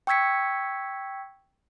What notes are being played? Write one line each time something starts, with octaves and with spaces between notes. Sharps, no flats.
G5 C#6 E6 G#6 B6 C#7